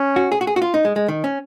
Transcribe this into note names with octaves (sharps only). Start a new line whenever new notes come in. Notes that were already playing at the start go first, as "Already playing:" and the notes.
Already playing: C#4
F#4
G#4
F#4
G#4
F#4
F4
D#4
G#3
G#3
D#3
C#4